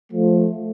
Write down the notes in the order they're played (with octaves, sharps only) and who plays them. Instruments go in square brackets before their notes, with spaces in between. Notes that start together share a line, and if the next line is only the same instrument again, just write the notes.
[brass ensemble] F3 A3